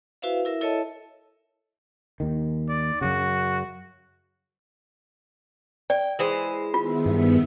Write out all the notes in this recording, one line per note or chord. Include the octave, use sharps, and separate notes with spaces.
E4 F#4 B4 C5 E5 F5
E4 A#4 E5
E4 A4 C#5 D#5 E5 A5
D#2 D#3
D5
F#2 C#3 F#4
D5 G5
E3 G#3 C5
D#3 B3 F4 E5
G2